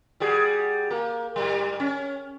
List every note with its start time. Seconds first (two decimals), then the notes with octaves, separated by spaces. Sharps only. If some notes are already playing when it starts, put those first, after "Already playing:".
0.20 G3 F#4 G#4
0.90 A#3
1.36 G#2 G3
1.80 C#4